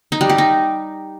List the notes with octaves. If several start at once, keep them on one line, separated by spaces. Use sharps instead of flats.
D#4
G3
G4
D#4